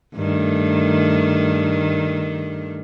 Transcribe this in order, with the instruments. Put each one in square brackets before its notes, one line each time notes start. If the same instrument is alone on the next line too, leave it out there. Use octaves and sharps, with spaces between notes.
[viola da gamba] G2 D#3 A3